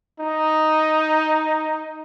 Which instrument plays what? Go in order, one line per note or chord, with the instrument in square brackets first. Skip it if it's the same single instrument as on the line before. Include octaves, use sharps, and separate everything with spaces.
[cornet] D#4